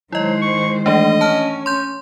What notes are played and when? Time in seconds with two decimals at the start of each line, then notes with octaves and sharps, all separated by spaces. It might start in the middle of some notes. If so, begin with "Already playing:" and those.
0.12 D#3 F#3 G#3 E4 C5 D#5
0.42 C#6
0.86 E3 A3 D4 D#5
1.21 C#4 A5 F6
1.66 C6 G6